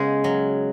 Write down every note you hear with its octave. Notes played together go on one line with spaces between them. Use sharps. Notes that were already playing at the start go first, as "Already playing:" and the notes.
Already playing: C#3 G#3 B3
F#3